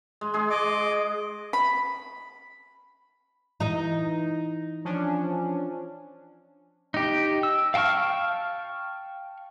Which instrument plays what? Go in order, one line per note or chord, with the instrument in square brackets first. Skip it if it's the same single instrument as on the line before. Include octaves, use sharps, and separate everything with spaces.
[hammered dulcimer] G#3
G#3 G#4
[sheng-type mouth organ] D#5 D6
[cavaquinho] B5
[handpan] E3 [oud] D#4 D#5
[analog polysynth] F3 C#4 D4
[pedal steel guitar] D#4 G4
E6
F5 G5 A5 C#6 F6